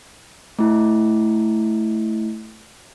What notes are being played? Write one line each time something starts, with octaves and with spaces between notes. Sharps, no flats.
A3 E4